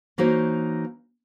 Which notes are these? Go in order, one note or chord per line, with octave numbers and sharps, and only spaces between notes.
E3 A#3 D#4 F#4 C5 C#5